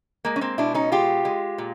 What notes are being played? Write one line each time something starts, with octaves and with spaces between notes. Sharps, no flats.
G#3 A#3
C#4
A#3 C4
B2 D4 E4
C#4 D#4
G#3 F4 G4
G#3
A#2